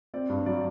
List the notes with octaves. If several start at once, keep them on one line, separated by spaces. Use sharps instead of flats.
C4 D5
G2
F#3 D5